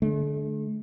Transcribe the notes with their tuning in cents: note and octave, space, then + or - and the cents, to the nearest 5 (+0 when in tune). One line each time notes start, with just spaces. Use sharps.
D3 +0 A3 -45